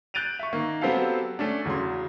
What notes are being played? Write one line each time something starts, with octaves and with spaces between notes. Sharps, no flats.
F#6 G6 A6 D7 D#7 F7
E5 C#6
D#3 A#3
F#3 B3 C4 G4 A4 F5
A3 C#4 D4
E2 C#3 F#3 C6